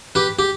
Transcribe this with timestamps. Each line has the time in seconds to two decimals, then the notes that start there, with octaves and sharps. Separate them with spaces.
0.15 G4 B4
0.39 G4